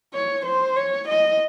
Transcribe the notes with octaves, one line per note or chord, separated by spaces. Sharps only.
C#5
C5
C#5
D#5